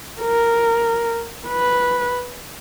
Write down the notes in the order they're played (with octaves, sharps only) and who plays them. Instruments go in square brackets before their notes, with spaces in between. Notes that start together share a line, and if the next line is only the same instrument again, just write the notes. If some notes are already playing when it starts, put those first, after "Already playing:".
[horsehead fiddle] A#4
B4